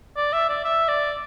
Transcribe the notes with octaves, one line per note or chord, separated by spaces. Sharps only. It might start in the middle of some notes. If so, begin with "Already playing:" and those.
D5
E5
D5
E5
D5